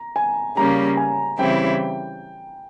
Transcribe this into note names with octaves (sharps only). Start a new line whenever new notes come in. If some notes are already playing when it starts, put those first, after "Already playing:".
Already playing: A#5
G#5
C#3 G3 A#3 C#4 A#5
G#5
C#3 E3 G3 C4 E4 G5